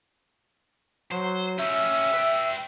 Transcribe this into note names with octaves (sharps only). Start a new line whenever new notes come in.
F#3 C5
C#4 G4 E5
B4 G5